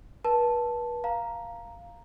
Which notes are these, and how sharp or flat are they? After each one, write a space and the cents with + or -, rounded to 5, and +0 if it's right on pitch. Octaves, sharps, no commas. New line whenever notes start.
B4 -35 A5 +0
F5 +0 A#5 +0